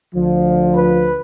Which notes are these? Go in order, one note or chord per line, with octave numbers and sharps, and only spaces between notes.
D2 D3 F3
B4